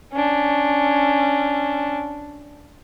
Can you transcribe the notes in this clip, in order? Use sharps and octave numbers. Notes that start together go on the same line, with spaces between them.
C#4 D4